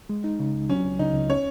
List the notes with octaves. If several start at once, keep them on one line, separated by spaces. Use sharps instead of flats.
G#3
D#4
C#3
C#2
F#3 C#4
C#2
C#3 D#4
C#2
C#4 C#5